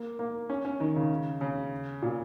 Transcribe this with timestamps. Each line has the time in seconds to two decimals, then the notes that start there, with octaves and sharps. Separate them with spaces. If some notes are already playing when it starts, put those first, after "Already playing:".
Already playing: A#3
0.19 A#3
0.50 C#4
0.65 C#4
0.80 D#3
0.96 C#3
1.41 C#3
2.02 A#2